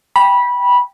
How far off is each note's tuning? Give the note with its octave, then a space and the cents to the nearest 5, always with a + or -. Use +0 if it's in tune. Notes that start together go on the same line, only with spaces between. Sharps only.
G5 +10 B5 -15